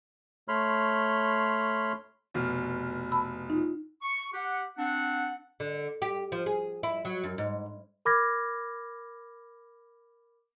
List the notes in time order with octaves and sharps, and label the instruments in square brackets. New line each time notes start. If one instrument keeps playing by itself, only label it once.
[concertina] A3 C#5 B5 C6 F6
[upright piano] F1 B2 F6
[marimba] A5 B5 E6
D#4 F4
[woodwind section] C#6
G4 F#5
C4 D4 F#5
[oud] D3
G4
F3
G#4
E4
F#3
F#2
G#2
[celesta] A#4 B5 D6 F6 G#6 A#6